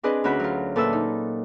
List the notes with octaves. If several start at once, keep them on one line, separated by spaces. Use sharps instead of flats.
C4 D4 G#4 B4 D#5
D2 C#4 F#4 B5 G6
F#3 F4
A#2 A4 B4 E5 E6
D#4